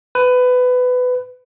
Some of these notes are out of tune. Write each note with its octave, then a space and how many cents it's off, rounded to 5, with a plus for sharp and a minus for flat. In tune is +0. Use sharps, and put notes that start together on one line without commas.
B4 +20